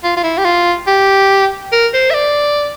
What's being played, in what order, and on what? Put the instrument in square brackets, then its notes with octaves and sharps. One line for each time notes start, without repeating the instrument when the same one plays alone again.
[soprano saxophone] F4
F4
E4
G4
F4
G4
A#4
C5
E5
D5